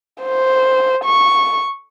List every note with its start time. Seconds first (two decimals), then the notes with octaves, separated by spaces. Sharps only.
0.22 C5
1.05 C#6